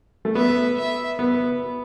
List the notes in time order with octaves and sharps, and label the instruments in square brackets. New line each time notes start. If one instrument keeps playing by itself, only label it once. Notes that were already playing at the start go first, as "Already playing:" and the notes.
[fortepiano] A3
[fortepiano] B3 [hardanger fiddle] E5
[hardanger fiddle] E5
[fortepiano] B3